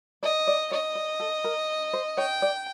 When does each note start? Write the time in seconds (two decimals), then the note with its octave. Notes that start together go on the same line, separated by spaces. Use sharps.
0.23 D5 D#5
0.47 D5
0.71 C#5 D#5
0.95 D5
1.20 A4
1.44 A#4
1.93 C5
2.17 C#5 G5
2.42 D5